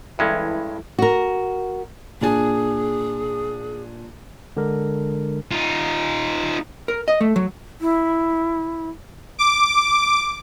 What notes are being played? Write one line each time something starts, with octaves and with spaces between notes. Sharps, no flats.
G2 E3 G#3 C#4 E4 A4
F#4 A#4
A#2 D4 G#4 G#5
D3 G#3 D4 A#4
D#4 F4
A#4
D#5
A3
F#3
E4
D6